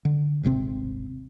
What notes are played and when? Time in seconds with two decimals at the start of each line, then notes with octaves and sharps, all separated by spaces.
0.05 D3
0.43 D#1 G#1 C3 C4